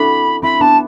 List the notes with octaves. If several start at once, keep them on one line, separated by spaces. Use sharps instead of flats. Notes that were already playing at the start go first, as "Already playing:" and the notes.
Already playing: C4 D4 E4 F#4 A4 B5
C4 E4 B5
B3 D4 A5